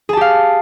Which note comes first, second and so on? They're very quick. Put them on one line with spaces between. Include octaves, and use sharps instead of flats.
G#4 A5 G4 F5